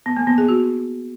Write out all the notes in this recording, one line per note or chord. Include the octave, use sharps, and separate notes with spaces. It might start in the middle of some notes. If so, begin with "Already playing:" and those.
B3
A#3
B3
G#4
F#4